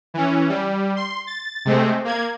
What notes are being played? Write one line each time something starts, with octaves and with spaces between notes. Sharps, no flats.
E3 C#4
G3
C6
A6
C3 G#3 A3 C4
A#3 G#6